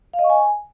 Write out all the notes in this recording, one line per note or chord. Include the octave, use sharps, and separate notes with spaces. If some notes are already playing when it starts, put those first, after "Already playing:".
F5
D#5
C#6
G#5